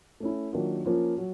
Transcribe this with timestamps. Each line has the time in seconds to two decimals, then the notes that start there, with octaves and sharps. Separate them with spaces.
0.20 A3 C#4 E4
0.53 D#3 F#3 A#3 D4 F4
0.86 F3 A#3 C#4 F4
1.18 F#3